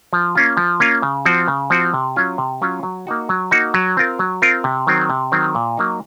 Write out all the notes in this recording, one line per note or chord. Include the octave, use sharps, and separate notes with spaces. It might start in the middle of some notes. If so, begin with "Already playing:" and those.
F3
A#3 C#4 F4
F3
A#3 C#4 F4
C#3
F3 C4 F#4
C#3
F3 C4 F#4
C3
F#3 C#4 F4
C3
F#3 C#4 F4
F#3
A#3 D#4 F#4
F#3
A#3 D#4 F#4
F#3
C4 F4 A#4
F#3
C4 F4 A#4
C3
D#3 F#3 C4
C3
D#3 F#3 C4
A#2
F#3 A#3 D#4